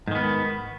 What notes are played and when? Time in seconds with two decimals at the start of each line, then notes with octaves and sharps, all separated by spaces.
0.07 G#2
0.11 D#3
0.15 B3